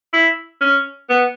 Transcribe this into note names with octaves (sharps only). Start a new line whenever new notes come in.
E4
C#4
B3